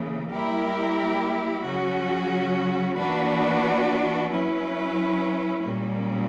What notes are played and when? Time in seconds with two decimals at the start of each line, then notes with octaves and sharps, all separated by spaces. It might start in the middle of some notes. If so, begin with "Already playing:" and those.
Already playing: C#3 E3 A#3
0.31 G3 A#3 E4 G4 A#4
1.63 C#3 F#3 C#4 F#4
2.96 E3 A#3 D4 F#4 B4
4.29 F#3 C#4 E4 B4
5.62 A#2 G3 A#3 C#4